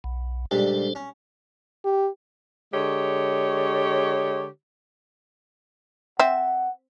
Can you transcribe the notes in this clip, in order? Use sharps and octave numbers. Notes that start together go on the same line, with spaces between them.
B1
C#2 A#2 G3 D4 A4 C5
C#4
G4
D3 G#3 G4 C#5
C4 E5 F#5